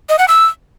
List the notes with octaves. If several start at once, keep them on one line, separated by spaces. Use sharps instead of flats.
D#5
F#5
E6